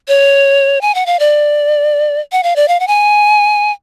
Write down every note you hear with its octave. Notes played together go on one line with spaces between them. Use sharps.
C#5
G#5
F#5
F5
D5
F#5
F5
D5
F5
F#5
G#5